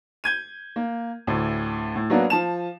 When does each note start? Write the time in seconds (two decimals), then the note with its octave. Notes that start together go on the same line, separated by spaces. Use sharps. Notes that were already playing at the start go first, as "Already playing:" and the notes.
0.24 G6 G#6 D#7
0.76 A#3
1.27 D2 A2
1.96 A2
2.10 F#3 A#3 B3 D4 F#4
2.30 F3 A5 E7